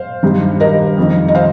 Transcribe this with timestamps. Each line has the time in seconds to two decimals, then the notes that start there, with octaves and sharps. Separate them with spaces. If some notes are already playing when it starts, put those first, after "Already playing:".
Already playing: C5 F5
0.23 G2 D#3
0.60 A#4 D#5
0.98 F2 D#3
1.28 D#5
1.35 C5 F5